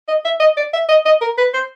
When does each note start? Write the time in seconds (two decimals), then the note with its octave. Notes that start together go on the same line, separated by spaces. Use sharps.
0.08 D#5
0.25 E5
0.40 D#5
0.57 D5
0.73 E5
0.89 D#5
1.06 D#5
1.22 A#4
1.38 B4
1.54 C5